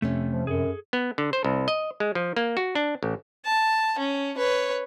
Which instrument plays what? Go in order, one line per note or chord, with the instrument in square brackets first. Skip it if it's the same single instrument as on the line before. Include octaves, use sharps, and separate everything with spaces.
[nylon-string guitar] F2 C3 C#4 [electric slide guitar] A3
[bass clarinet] F3
[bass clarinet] F#2 [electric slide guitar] G#4 A4
[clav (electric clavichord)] B3
D3
C5
C2
D#5
G#3
F3
A#3
F#4
D4
A1
[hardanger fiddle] A5
C#4
B4 C#5